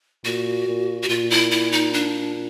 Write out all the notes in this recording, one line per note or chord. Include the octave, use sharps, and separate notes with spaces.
A#2 F#4
A#2
F#4
A#2 F4
E4
E4
D#4
D4